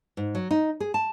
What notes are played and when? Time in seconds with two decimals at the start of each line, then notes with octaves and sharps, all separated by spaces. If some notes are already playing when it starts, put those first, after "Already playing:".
0.17 G#2
0.35 F#3
0.51 D#4
0.80 G#4
0.94 A5